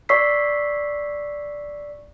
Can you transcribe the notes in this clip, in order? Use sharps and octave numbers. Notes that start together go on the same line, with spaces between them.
D5 C#6 E6 B6 C7